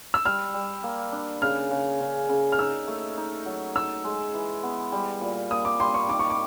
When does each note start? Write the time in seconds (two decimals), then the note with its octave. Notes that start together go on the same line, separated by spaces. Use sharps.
0.14 E6
0.25 G3 F6
0.54 G3
0.84 A#3
1.12 D4
1.42 C#3 F6
1.71 C#3
2.01 C#3
2.29 C#3
2.52 F6
2.58 D#4 E6
2.88 A3
3.18 D#4
3.46 F#3
3.75 D#4 E6
4.04 G#3
4.34 E3
4.63 B3
4.92 G3
5.21 A#2
5.51 A#2 D#6
5.65 D6
5.80 G3 C6
5.94 C#6
6.09 D#3 D6
6.19 C#6
6.30 D6